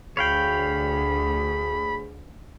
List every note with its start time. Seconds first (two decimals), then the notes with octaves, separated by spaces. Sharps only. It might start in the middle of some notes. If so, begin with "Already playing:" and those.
0.17 D2 G#4 C#5 F5 G5 B5